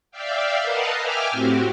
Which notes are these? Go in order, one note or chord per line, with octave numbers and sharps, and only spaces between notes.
D5 E5 F5 G5
A#4 B4 D#5 F5 F#5 A5
E5 G5 G#5 D6 F6
A2 C4 F#4 G4